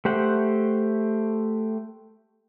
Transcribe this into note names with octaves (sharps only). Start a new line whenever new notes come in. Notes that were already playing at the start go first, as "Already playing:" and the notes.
A3 G4 C5 F#5